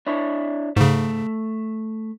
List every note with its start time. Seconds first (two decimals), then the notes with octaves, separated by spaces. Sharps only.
0.07 D4 E4 C#5
0.76 G#2 C#3 A3